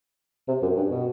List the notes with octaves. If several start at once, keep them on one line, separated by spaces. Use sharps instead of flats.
C3
F#2
G2
B2